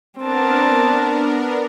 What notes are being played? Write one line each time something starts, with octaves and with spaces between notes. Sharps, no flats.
B3 C4 D4 A#4 A5